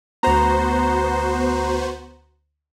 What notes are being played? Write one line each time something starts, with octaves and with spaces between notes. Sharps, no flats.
D2 B3 F#4 C5 A#5